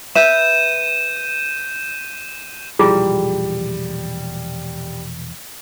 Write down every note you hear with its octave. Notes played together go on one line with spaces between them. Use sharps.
B4 E5 G6 D#7 E7
E1 A#2 F3 G3 E4 F4 G#4